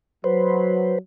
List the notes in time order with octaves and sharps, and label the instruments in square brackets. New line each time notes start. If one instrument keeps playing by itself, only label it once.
[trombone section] F#3 [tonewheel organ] B4 C5